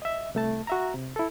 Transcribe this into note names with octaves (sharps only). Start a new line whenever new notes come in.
D#5 E5
C2 A3 A5
F#4 E5 A#5
C3
E4 A4